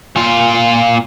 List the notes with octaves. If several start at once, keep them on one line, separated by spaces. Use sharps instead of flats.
A#2 F4